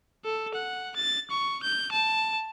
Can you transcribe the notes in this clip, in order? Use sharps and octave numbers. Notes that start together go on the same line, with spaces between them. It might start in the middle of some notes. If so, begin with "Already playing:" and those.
A4
F#5
A6
C#6
G6
A5